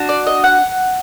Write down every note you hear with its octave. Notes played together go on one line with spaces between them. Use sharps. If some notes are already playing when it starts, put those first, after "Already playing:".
Already playing: D4 F#4
D5
D#5
F#5